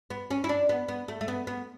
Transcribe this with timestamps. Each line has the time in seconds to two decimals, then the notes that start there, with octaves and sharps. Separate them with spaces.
0.10 B3
0.31 C#4
0.44 E4
0.49 D4
0.69 B3
0.88 B3
1.08 A3
1.21 A3
1.28 B3
1.47 B3